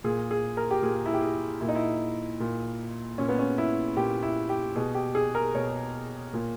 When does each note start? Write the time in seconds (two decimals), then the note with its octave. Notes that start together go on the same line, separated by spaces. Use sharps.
0.04 A#2 G#4
0.31 G#4
0.57 A#4
0.71 G4
0.82 A#2 G#4
1.06 E4
1.14 G4
1.21 G#4
1.61 A#2 E4
1.68 D#4
1.75 E4
2.40 A#2
3.18 A#2 C#4
3.29 B3
3.39 C#4
3.58 E4
3.97 A#2 G4
4.23 E4
4.49 G4
4.76 B2 G#4
4.95 G4
5.15 G#4
5.35 A#4
5.54 B2 C#5
6.33 A#2